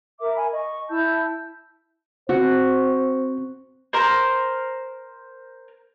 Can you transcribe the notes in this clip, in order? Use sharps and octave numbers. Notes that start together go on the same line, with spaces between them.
A#4 E5 D6
G#5 B5
D#5 C#6
E4 A5 E6 G6
C4 F#4 C5
A#4 C5